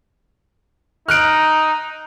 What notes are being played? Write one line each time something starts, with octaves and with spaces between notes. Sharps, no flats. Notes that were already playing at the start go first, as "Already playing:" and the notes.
D#4 F6 F#6 D7